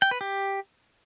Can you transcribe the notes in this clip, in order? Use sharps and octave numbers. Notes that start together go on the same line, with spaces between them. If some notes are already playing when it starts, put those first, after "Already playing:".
G5
B4
G4